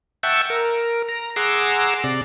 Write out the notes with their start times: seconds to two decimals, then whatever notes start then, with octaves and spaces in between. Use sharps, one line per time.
0.23 E5 F#5 G5 A5 C#6 E6
0.50 A#4
1.09 A#5
1.36 G#4 F#5 A#5 C6 D6 E6
2.04 C3 D5